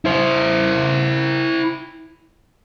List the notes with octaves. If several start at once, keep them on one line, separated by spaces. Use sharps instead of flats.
E4 C5